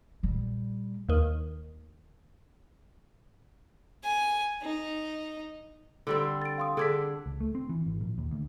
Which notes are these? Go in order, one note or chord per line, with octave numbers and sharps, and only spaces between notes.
A#2 G3
D#2 D#3
G#5
D#4
D3 G3 C4
A6 D7
F5 C6 D#6
D3 D4 G#4 G#6 B6
C#2
A3
C4
E3
G#1
A#1
D#2
D2